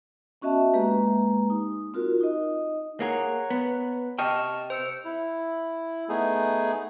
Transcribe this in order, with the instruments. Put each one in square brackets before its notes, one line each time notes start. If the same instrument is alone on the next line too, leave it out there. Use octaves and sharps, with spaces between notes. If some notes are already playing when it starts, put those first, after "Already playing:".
[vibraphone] B3 C#4 F#4 D#5 E5 A5
G#3 A#3 G4 B4 A#5
D#4
C4 F4 F#4 A#4
D#4 D#5
[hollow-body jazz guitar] A#3 G#4 [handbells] C#5 F#5 A#5
[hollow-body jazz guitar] B3
[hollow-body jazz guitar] C3 D#5 G5 [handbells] A5 C#6 F6
[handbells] C5 E6 C#7
[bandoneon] E4
A3 B3 D#4 G#4